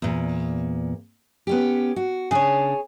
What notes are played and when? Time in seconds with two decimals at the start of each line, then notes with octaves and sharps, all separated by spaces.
0.02 E2 A#2
1.47 B3 C#4 G4
1.96 F#4
2.31 C#3 D4 G#4 C#5